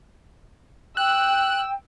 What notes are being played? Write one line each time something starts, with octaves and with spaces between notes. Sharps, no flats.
G5 E6 F#6